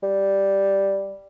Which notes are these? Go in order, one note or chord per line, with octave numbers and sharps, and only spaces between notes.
G3